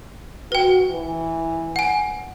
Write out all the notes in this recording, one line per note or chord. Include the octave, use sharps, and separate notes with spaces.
F#4 B4 G5
E3
F#5 G#5